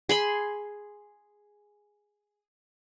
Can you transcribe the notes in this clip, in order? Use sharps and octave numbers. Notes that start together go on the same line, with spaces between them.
G#4 B5 C6